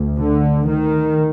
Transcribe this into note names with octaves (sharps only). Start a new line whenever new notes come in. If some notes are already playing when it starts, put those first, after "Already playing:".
Already playing: D2
D3
D#3